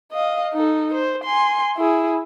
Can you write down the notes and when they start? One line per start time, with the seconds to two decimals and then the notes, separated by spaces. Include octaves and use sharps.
0.12 D#5 F5
0.54 D#4 A4
0.94 C5
1.24 G#5 C6
1.77 E4 G#4